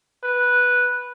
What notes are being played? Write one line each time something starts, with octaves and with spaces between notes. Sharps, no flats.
B4